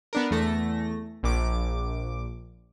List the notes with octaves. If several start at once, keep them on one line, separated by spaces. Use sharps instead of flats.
B3 D4 A#4
E2 A3 A#6
A#1 D6